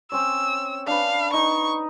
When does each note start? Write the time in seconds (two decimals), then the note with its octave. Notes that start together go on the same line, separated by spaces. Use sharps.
0.12 C4 C#4 C#5 E6
0.87 D4 B4 F5
1.33 D#4 C#6